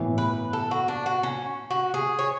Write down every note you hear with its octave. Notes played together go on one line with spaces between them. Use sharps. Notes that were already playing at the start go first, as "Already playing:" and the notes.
Already playing: A2 E3 B3
B4
A4
F#4
D4
F#4
C#4
F#4
G#4
C#5